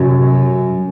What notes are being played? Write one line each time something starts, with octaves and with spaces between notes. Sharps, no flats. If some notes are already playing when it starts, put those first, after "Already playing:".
Already playing: F#2 C3